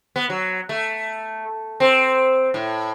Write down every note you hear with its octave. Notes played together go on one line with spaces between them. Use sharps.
B3
F#3
A3
C4
A2